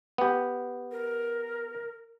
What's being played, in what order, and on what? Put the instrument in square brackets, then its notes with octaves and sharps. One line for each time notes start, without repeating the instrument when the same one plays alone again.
[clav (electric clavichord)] B3 G4
[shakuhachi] A#4